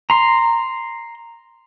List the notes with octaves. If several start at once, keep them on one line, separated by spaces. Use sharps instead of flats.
A#5 C6